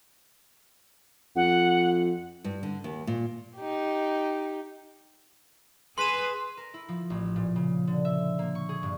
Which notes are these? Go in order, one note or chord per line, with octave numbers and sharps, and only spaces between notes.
F2 F#5
G2
D3
D#2
A#2
D#4 G4
G#4 B4 C6 E7
A#4
E4
F3
A1
A#2
C#3
D3
E5
A#3
C#6
G#4
G2